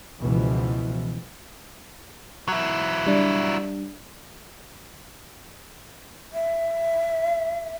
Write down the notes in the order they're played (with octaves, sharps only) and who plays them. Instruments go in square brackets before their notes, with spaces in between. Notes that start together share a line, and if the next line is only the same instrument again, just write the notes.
[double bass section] C#2 B2 E3 F3
[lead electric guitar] F#3 E4
[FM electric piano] G3 D4
[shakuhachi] E5